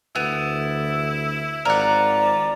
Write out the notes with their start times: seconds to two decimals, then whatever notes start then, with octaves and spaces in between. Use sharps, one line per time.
0.16 D2 B3 E4
1.65 G#1 F3 A#4 D5 F#5